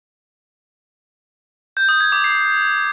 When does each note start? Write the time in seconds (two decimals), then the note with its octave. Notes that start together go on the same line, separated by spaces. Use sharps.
1.77 G6
1.89 D#6
2.00 G#6
2.12 D6
2.24 C7